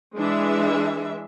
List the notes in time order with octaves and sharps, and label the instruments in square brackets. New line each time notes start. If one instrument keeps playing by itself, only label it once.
[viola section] E3 G#3 D4 E5